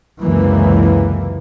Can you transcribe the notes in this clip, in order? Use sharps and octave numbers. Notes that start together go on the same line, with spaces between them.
C#2 F#2 C3 E3 G#3 A#3